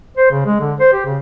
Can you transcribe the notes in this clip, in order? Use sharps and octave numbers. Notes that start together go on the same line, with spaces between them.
C5
C#3
G#3
D3
C5
G4
C#3